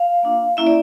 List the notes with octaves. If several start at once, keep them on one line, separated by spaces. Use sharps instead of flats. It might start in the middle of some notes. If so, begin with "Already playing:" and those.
Already playing: F5
A#3 D4 F4
A#3 C#4 E4 E5
D5